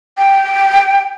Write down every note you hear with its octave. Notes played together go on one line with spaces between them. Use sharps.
G5